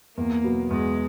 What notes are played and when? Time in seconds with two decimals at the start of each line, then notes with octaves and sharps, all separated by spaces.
0.17 E2 A#3
0.44 B2 F#3 B3
0.70 E2 G#3